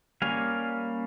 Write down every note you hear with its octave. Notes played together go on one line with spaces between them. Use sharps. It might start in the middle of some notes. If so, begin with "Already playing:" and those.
G3 A#3 C#4 F5 G#5